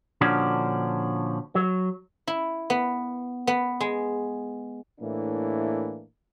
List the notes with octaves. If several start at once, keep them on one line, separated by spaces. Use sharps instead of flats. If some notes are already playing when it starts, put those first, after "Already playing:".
A#2 D3 F3 C#4 D4 F#4
F#3
E4
B3
B3
G#3
A2 E3 A#3 D4